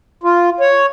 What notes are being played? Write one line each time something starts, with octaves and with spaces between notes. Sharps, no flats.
F4
C#5